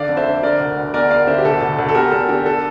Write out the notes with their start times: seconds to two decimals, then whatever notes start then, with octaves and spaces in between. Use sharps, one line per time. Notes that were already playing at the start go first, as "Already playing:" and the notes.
Already playing: D3 D5 F5
0.09 F2
0.17 C5 E5
0.26 D3
0.42 D3 A#4 D5
0.60 D2
0.77 D2
0.93 E2 A#4 D5
1.10 E2 D5 F5
1.27 D3 C5 E5
1.38 G4
1.45 D2 A4
1.62 D2
1.79 D2
1.89 A4
1.95 E2 G4 A#4
2.12 E2 A4
2.29 D3 G4
2.46 A4